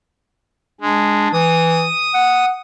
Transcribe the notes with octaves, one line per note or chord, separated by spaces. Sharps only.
G#3 D4
E3 D#6
F#5